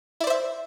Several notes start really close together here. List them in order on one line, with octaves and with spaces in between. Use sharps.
E4 D5 C5 E5